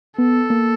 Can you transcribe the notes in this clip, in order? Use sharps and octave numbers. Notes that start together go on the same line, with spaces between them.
B3 A4
A#3